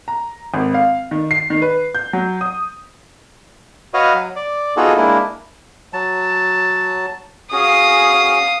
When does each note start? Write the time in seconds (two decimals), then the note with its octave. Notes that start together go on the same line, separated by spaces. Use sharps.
0.08 A#5
0.54 G#1
0.74 F5
1.11 D#3
1.31 C7
1.50 D#3
1.62 B4
1.95 G6
2.13 F#3
2.41 D#6
3.94 F#4 B4 C#5 D#5 F5
4.14 F#3
4.36 D5
4.77 B3 D#4 F4 F#4 G#4 A4
4.97 G#3 A#3 D4 E4
5.93 F#3 A5
7.52 C#4 F#4 G#4 F5 D#6